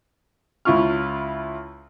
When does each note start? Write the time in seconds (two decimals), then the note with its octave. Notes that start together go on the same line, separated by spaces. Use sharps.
0.65 C#2 E4 F4 C#6 F6